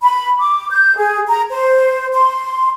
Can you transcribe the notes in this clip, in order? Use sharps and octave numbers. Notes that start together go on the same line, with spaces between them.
B5
D6
G6
G#4
A#5
C5
C6